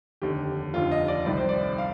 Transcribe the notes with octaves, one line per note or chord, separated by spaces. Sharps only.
F1 D#2 D3 G4
F1 D#2 D3 F4
D#5
D5
C2 C3 D#3 D5
C5
D5
F5